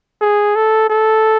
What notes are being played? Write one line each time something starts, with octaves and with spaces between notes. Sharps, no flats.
G#4
A4
A4